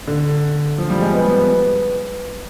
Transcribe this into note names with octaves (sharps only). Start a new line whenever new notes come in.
D3
F3
G3
G#3
B3
B3
B3